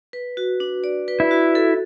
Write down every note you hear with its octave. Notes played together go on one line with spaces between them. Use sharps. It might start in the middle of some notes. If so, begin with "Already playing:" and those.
B4
F#4
D4
D5
B4
E4
F#4
A4